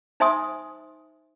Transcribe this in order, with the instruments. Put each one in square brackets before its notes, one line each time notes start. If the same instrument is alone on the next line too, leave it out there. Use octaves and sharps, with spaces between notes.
[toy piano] D#4 C5 E5 G#5 C6 D#6